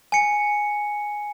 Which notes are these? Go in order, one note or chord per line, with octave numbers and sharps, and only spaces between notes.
G#5 C#7